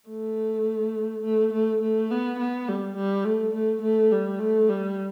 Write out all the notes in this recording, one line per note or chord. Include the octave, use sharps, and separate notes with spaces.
A3
A3
A3
A3
B3
B3
G3
G3
A3
A3
A3
G3
A3
G3